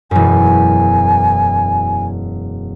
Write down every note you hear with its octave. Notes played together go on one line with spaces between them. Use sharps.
E1 F#2 G#5